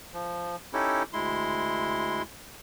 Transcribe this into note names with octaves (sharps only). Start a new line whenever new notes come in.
F3
C#4 D#4 E4 G4 A4
D2 G#3 E4 C6